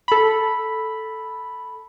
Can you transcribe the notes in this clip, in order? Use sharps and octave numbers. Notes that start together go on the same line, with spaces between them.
A4 B5